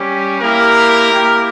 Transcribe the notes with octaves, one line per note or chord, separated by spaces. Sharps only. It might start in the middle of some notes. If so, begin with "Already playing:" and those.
Already playing: G3 C#4 G4
A#3 E4 G4 A#4
A#3 E4 G4